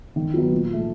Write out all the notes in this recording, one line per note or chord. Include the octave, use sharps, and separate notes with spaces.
D#3
F#3 B3 D#4
A#2
F3 A3